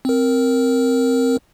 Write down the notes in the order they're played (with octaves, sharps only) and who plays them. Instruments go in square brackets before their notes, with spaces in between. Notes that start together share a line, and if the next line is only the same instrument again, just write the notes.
[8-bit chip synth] C4 A#4